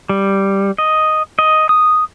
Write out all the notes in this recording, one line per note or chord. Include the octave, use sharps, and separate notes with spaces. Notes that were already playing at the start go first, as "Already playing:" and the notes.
G3
D#5
D#5
D#6